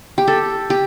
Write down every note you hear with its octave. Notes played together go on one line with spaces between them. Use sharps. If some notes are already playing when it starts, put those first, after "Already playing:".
G4
A4
G4